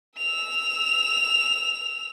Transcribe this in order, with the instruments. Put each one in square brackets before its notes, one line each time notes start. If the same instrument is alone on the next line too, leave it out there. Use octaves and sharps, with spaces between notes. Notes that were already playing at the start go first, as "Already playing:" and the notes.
[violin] E6 F7